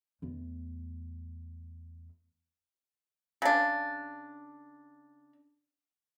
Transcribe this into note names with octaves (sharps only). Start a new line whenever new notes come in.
E2 A3
C#3 D4